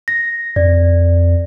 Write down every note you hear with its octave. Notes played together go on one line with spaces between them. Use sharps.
A#6
F2 D5